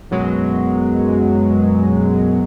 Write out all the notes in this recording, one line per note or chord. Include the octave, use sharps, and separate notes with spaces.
F#2 B2 F#3 G#3